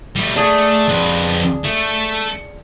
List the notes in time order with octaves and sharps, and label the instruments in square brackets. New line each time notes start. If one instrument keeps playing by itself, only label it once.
[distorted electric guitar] G3 A3
[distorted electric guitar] A3 [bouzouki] D4 G#4
[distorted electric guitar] F2 B4
A3